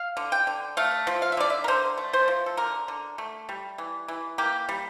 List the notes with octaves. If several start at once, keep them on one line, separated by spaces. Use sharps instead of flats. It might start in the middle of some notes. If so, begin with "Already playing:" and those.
Already playing: F5
D3
G5
D3
A3 F5
F3
F5
E5
D3 D5
E5
A#4
D3 C5
A3
C5
F3
A4
D3 A#4
D3
A3
G3
E3
E3
A#3 G4
G3